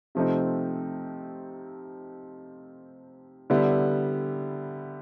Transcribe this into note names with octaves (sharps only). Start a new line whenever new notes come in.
C3 F3 A3 C4 D#4
D3 G3 B3 E4